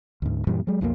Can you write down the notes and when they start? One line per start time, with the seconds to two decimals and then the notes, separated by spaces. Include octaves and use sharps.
0.22 D2 G#2
0.47 F#2 A#2 E3 G3
0.67 F#3 G#3
0.81 B1 F2 D#3 A#3